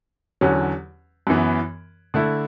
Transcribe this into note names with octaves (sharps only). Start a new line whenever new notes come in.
E2 D3 F#3 C#4
F#2 E3 B3
D3 A3 E4